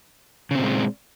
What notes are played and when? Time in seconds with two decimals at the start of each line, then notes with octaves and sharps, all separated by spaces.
0.51 C#3
0.55 C4
0.59 A#2
0.64 G#3